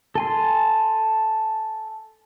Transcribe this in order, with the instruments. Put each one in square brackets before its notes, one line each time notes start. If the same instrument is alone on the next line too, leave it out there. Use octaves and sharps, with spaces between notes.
[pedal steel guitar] A4 G#5 C6